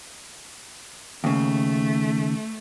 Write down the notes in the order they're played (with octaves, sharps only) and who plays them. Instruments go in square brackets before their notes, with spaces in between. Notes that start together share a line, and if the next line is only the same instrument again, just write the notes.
[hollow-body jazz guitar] D#2 C#3 [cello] A3